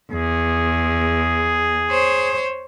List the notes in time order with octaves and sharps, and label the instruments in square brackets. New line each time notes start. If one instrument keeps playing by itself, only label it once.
[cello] E2 [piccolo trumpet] G#4
[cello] C5 C#5